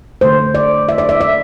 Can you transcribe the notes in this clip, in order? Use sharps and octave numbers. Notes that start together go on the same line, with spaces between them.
D3 A3 C5
D5
E5
D5
E5
E5